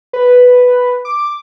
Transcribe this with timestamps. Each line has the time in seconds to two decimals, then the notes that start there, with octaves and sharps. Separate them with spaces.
0.13 B4
1.05 D6